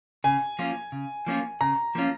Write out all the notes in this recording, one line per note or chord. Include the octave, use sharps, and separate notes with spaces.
C#3 G#5
F3 A#3 C#4 F4
C#3
F3 A#3 C#4 F4
C#3 A#5
F3 A#3 C#4 F4